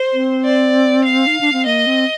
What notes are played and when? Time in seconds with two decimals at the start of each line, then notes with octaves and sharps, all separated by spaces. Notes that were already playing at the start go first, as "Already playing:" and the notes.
Already playing: C5
0.13 C4
0.45 D5
1.05 F5
1.27 D#4
1.41 D4
1.53 C4
1.66 A#3 D#5
1.87 C4